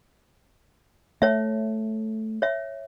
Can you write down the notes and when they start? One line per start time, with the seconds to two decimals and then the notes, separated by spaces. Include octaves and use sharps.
1.22 A3 C#5 E5
2.42 C#5 E5